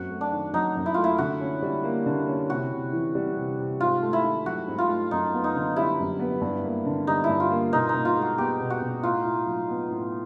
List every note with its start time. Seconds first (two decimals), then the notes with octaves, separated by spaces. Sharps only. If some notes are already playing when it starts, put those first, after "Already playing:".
Already playing: F#2 C4 F#4
0.10 A3
0.21 D4
0.32 D#3
0.53 F#3 D#4
0.75 F#2
0.86 E4
0.94 A3 F4
1.04 E4
1.18 D3 F#4
1.41 C#4
1.62 G3
1.84 A#3
2.06 D3
2.28 C#4
2.49 C3 F#4
2.72 C3
2.93 E3
3.15 G3
3.37 C3
3.58 C3
3.80 G#2 F4
4.02 A3
4.13 E4
4.24 D#3
4.46 F#3 F#4
4.68 G#2
4.78 F4
4.89 A3
5.11 F#2 D#4
5.33 B3
5.44 D#4
5.55 D3
5.76 G3 E4
5.99 F#2
6.19 B3
6.41 G2
6.64 A#3
6.86 D3
7.07 G3 D#4
7.24 E4
7.29 G2
7.40 F4
7.50 A#3
7.73 B2 D#4
7.89 D#4
7.94 B2
8.05 F4
8.16 G#3
8.22 F#4
8.38 B3 G4
8.60 B2
8.70 F#4
8.81 B2
9.03 A2 F4
9.25 E4
9.47 F#3
9.68 B3
9.91 A2